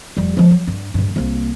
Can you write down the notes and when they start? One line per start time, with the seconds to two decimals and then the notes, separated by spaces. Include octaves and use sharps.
0.17 F1 G3
0.37 F3 G#3
0.51 F#3
0.67 G2
0.94 D1 G2
1.16 C2 A#3